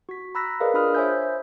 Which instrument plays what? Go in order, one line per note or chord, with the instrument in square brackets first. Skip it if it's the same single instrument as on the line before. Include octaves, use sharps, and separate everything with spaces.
[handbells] F#4 B6
A#5 B5 E6 F#6 A#6 B6
G#4 A#4 B4 D5 D#5 F5
D4 F4 G#4 B5 D#6 F6
C5 C#5 E5 G#5 E6 G6